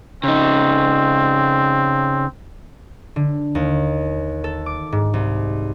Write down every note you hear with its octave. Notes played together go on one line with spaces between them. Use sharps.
C#3 C4 D#4
D3
D#2
A4
D6
G#2
C2